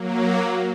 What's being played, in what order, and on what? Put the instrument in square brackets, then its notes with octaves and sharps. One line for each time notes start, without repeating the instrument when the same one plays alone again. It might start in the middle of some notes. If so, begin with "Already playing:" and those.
Already playing: [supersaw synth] F#3 A#3